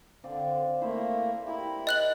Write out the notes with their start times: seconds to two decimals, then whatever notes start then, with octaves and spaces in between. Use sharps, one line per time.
0.24 D3 C4 D5 F5
0.81 A3 A#3 E4 C5 B5
1.46 E4 G4 A#4
1.87 D#5 F#6 F#7